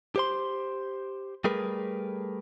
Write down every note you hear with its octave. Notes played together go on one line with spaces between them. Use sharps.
G4 C5 C6
G3 A3 G#4 A#4 B4